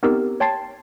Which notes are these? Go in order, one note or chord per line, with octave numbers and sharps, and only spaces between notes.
B3 C4 D#4 G4 A#4 E6
C#5 G5 A5 C6 A6 C7